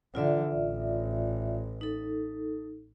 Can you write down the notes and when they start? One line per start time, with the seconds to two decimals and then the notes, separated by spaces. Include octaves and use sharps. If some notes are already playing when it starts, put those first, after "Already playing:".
0.15 D3 E3 F4 D5 E5
0.54 A1
1.81 D#4 A4